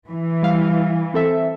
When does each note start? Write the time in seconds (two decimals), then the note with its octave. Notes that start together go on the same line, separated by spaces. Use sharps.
0.11 E3
0.43 G3 F5
1.14 C4 A4 E5